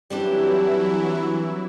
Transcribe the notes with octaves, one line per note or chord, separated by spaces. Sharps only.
E3 F#3 G3 C4 D4 E4